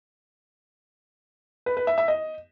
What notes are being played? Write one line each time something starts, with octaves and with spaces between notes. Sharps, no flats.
B4
B4
E5
E5
D#5